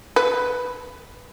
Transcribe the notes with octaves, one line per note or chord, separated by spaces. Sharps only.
B4